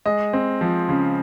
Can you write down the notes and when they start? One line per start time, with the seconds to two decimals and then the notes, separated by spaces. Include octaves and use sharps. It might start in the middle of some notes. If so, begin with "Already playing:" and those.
0.06 G#3 D#5
0.33 C4
0.61 F3
0.89 C#3